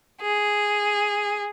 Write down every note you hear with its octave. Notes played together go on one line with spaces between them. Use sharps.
G#4